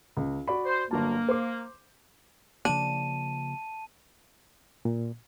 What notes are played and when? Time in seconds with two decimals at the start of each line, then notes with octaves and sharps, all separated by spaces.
0.17 C#2
0.48 F#4 D5 B5
0.65 C5
0.91 G1 F#3 A#3 A5
1.29 C5 D6
2.65 C#3 F3 A#3 D4 A5 D#7
4.85 A#2